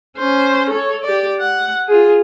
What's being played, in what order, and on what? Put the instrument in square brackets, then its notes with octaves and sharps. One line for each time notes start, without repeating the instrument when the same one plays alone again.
[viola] C#4 C5
A4 C#5
G4 D5
F#5
F4 G#4